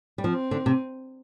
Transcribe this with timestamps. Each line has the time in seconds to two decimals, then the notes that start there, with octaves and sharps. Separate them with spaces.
0.18 G3
0.24 F3 C4
0.51 D3
0.66 C3